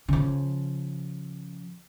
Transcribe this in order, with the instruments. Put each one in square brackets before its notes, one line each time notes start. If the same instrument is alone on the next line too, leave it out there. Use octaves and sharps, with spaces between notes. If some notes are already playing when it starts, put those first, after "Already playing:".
[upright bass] C#3 F3